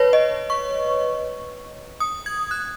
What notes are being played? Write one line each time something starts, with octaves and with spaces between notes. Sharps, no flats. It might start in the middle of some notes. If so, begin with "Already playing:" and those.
Already playing: B4 C#5
D#5
C#6
D#6
G#6
F#6